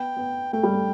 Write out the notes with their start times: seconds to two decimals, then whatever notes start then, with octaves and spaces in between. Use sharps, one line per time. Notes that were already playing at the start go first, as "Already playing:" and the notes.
Already playing: B3 G5
0.17 B3
0.53 A3 G5
0.63 G3
0.74 A3